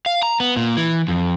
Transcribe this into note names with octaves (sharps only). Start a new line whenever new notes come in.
F5
A#5
B3
A#2
E3
F2